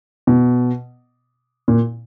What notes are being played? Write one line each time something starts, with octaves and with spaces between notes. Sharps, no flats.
B2
A#2